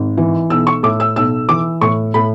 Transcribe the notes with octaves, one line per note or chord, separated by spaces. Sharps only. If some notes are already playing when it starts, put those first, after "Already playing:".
Already playing: G#1
E3
B1 E6
C#6
A2 D6
E6
B1 E6
E3 D6
A2 C#6
A2 B5